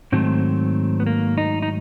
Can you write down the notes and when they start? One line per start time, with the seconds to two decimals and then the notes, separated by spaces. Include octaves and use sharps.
0.12 G#2 D#3 F#3 A3 C4
1.00 B3
1.06 A#3
1.38 D#4
1.62 D#4